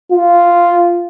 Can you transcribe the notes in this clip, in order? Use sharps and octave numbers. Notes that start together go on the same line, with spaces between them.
F4